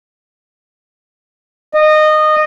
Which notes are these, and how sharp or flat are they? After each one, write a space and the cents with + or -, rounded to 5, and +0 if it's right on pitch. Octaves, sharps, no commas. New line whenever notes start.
D#5 -20